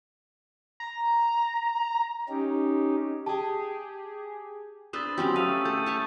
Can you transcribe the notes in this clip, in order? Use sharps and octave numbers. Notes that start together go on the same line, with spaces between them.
A#5
C#4 D#4 G4
G4 G#4 A5
D4 B4 C5 D#6 E6 A6
F#3 C4 C#4 G4
A3 F5 D#6 D#7
A4 G6
C#5 A5 B5